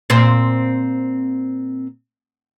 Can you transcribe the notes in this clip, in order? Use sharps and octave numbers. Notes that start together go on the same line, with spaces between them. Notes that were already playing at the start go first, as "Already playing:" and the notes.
A#2 C4 C5